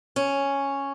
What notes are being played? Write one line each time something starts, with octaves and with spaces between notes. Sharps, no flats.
C#4